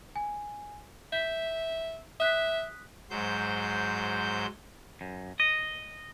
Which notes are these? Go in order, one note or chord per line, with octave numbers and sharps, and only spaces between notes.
G#5
E5 G6 B6
E5 D#6 F#6 B6
G#2 F#3 C5 G6
F#2
D#5